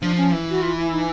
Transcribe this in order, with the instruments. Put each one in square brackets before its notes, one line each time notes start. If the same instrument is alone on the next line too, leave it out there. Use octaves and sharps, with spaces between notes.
[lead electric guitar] F3 [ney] D4
[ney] C#4
[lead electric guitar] E3
[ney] F#4
F4
E4
D#4